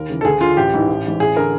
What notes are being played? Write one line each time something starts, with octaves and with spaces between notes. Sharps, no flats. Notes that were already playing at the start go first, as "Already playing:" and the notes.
Already playing: D#2 A#4
C#3 E3
A4
D2 G#4
D3 F4
A1 G4
G#2 E3
A1
G#2 E3
A1 G#4
D3 A#4